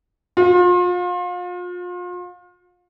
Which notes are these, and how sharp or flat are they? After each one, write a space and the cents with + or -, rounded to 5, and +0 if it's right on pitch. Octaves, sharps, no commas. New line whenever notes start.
F4 +35